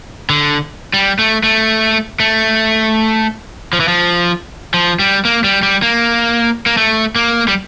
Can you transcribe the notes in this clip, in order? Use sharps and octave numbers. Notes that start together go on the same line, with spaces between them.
D3
G3
A3
A3
A3
F3
E3
F3
F3
G3
A#3
G3
G3
A#3
A#3
A3
A#3
G3